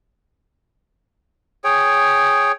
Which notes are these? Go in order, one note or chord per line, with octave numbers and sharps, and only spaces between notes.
G#4 C#5 G5